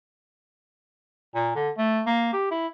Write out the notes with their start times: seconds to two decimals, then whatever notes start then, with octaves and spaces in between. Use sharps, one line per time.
1.35 A#2
1.55 D3
1.78 A3
2.06 A#3
2.33 G4
2.51 E4